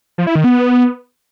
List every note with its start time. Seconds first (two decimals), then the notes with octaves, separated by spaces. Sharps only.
0.18 F3
0.27 E4
0.36 D#3
0.44 B3